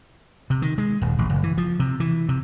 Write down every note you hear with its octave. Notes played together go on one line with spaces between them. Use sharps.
C3
D#3
G#3
D#1
A1
F#1
E3
F3
C3
E3
C3